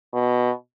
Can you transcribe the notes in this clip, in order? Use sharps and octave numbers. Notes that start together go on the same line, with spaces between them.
B2